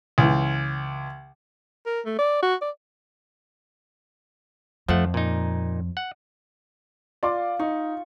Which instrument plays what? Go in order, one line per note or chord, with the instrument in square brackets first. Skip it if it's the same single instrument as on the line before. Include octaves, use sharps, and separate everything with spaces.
[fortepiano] C#2 E3
[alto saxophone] A#4
A3
D5
F#4
D5
[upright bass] F2 [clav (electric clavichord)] F3 A3 F#5
[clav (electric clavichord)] A#2 D#4
F#5
[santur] F4 [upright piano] D5 C6 D6
[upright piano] D#4 [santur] C#6